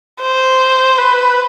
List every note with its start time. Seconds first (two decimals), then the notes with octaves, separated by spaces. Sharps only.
0.21 C5
0.98 B4